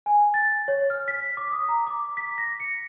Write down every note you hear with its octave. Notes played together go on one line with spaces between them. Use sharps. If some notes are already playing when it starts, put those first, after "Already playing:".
G#5
A6
C#5
F6
B6
D6
D#6
A#5
D6
B6
A#6
C#7